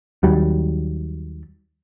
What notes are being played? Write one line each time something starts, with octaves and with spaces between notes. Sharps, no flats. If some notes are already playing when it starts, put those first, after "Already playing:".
D#2 F#3 G3